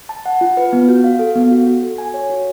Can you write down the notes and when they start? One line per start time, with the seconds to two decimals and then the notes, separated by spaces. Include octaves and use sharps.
0.09 A5
0.26 F#5
0.41 F4
0.57 B4
0.73 B3
0.88 F#4
1.04 F5
1.19 A4
1.36 B3
1.51 F#4
1.67 F#4
1.83 A4
1.98 G#5
2.14 C#5
2.30 F#4